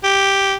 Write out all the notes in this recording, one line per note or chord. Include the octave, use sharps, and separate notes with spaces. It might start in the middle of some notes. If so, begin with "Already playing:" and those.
G4